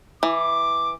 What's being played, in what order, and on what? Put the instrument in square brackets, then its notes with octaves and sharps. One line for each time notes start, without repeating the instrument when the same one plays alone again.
[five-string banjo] E3 [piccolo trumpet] D6